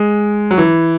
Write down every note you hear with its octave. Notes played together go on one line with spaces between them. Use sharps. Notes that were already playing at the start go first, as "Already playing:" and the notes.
Already playing: G#3
F#3
E3